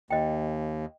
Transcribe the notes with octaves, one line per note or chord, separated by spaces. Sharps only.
D#2 D#5 G5